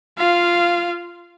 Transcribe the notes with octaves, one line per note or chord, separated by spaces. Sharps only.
F4 F5